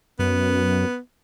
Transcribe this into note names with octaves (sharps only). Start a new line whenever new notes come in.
F#2 B3